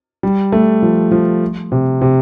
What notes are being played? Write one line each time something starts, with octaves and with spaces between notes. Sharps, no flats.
G3
A3
F3
F3
C3
C3